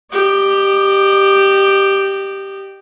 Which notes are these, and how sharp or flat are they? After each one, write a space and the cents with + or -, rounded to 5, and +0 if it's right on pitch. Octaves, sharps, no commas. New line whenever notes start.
G4 +0 D#5 -35